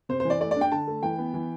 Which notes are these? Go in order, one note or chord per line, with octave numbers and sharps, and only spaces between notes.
C3 C5
C5
E3
D5
A3 D5
D5
D4 G5
D3 A5
A3
E3 G5
B3
E3